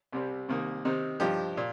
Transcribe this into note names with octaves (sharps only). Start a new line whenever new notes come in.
C2 C3 G3 C4
C2 C3 D#3 A#3
C3 D#3 C4 D#4
G2 F3 D#4 G4
A#2